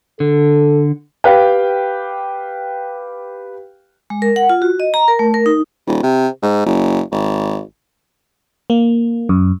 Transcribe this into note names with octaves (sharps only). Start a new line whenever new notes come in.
D3 A4
G4 B4 F5 G5
G#3
A#4
F#5
F4
F#4
D#5
A#5
A#4
A3
A#4
D#4
D#1
C3
G#2
F#1
G#1
A#3
F#2